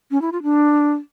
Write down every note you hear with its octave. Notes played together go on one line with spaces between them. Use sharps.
C#4
E4
F4
D4